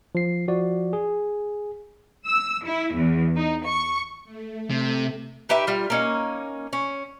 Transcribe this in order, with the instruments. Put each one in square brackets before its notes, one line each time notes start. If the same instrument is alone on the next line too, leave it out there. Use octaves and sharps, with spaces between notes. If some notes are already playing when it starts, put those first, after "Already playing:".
[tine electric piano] F3 C7
F3 F#4 D5
G#4
[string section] E6
E4
E2
D#4
C#6
[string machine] A3
[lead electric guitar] C3
[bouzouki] D#4 G4 B4 E5
G3 F4
A#3 C#4 D#4
C#4